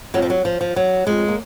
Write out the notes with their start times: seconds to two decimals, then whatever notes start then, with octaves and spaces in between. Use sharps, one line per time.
0.14 F2 F#3
0.22 F3
0.30 F#3
0.45 F3
0.61 F3
0.76 F#3
1.07 F2 G#3
1.28 A#3